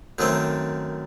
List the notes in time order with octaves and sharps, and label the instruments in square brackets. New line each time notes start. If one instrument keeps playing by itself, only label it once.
[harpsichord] F#2 D#3 A3 C4